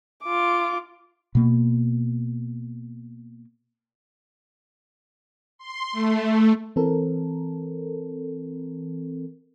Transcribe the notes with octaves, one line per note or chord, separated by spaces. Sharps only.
F4 D6
B2 A#3
C6
A3
E3 C4 A4 A#4